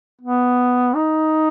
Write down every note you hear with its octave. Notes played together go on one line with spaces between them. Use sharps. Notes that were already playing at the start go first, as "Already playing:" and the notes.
B3
D#4